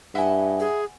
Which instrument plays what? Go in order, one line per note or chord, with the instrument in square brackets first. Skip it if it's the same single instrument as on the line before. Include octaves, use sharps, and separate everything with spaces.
[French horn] G2 [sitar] E4 D#5 E5 [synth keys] F#5 G#5
[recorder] G#4